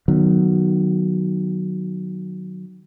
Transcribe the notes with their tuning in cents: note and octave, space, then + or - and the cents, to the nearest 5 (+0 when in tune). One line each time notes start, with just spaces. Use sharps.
D#3 -25 F#3 +0 B3 +0